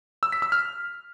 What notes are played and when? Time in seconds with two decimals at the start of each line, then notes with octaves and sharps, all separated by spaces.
0.23 E6
0.32 B6
0.42 E6
0.52 F6